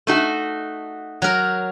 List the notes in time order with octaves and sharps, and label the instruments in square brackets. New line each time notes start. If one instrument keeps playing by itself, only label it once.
[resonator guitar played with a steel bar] A3 D#4 F#4
[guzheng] F#3 A#4